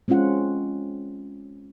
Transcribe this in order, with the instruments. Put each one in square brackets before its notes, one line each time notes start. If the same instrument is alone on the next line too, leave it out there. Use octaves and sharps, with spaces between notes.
[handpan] G#3 C4 C#4 F4 F#5